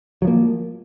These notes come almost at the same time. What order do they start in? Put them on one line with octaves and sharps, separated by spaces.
F#3 F3 A#3